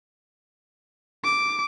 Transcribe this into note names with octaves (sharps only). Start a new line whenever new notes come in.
D6